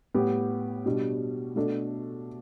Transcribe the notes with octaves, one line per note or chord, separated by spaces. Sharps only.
A2 G3 B3 G4
B2 G3 D4
B2 A3 D4 A4